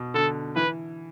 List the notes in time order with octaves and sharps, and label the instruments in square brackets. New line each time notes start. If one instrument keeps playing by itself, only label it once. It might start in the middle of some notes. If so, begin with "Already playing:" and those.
Already playing: [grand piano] B2
[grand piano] D3 [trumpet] A4
[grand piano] E3 [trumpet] B4